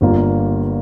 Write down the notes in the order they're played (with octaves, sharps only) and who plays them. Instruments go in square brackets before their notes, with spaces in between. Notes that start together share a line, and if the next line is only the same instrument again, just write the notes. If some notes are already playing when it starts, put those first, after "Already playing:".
[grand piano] G1 G2 G3 A#3 F4